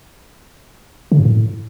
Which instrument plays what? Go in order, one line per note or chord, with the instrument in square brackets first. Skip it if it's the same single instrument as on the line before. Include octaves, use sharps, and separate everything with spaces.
[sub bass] D3
G2
A2